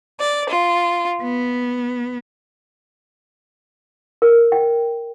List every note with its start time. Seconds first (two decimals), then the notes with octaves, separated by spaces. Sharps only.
0.20 D5
0.49 F4
1.21 B3
4.22 A#4
4.52 G5